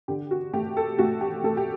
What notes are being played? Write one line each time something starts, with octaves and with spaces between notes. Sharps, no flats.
D3 G4
F#4
A3 G4
A4
A3 F#4
G4
A3 A4
G4